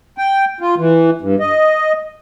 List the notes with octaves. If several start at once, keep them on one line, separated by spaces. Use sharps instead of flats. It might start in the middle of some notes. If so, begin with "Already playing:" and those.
G5
F4
E3
G2
D#5